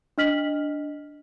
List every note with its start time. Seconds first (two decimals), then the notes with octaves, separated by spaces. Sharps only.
0.18 D4 D#5 F6 B6 F#7